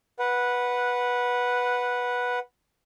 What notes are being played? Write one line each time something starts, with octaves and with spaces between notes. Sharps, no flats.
B4 F#5